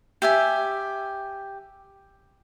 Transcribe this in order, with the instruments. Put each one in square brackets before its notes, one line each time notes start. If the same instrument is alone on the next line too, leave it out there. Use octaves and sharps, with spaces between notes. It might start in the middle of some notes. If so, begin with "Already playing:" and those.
[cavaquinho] G4 E5 G#5